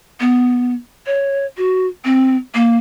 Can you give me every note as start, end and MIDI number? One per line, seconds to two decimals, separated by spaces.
0.20 0.74 59
1.06 1.46 73
1.57 1.87 66
2.05 2.35 60
2.55 2.77 58